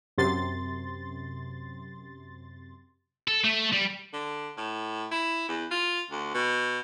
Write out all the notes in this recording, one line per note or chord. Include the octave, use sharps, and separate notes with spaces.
F#2 C3 C6 A6
A4
A3
G3
D3
A2
E4
E2
F4
D2
B2